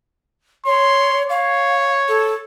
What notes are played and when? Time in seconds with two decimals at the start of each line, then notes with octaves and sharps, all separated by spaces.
0.66 C#5 C6
1.30 C#5 F5
2.09 A4